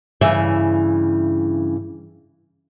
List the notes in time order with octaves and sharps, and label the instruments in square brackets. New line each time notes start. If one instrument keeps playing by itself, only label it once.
[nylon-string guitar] G2 C#3 E3 E5